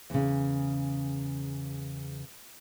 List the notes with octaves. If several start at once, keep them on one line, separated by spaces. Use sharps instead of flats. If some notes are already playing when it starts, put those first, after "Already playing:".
E2 C#3